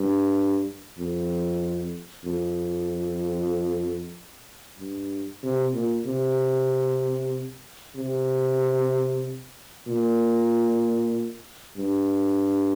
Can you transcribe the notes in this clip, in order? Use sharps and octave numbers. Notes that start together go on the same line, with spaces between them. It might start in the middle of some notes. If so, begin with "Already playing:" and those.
Already playing: G2
F2
F2
G2
C3
A#2
C3
C3
A#2
G2